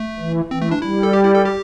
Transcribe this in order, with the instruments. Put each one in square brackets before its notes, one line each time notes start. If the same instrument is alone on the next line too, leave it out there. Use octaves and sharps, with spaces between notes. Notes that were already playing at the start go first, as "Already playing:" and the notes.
Already playing: [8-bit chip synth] A3
[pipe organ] E3
[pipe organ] E3 [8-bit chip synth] C4
[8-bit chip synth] A3
D4
[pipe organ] G3 [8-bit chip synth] E4
[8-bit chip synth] A4
G4
E4
A4
G4